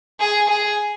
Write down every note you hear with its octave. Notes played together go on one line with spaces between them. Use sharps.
G#4
G#4